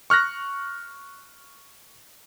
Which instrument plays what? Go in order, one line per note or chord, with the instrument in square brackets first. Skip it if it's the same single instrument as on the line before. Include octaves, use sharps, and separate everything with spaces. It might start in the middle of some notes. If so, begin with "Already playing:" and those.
[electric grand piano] C#6 F6 F#6 A#6